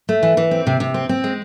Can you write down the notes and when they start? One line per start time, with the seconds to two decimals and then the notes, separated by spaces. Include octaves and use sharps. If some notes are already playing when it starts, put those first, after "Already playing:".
0.09 A3
0.23 E3
0.37 E3
0.51 C4
0.67 C3
0.80 C3
0.94 C4
1.09 C4
1.24 G#3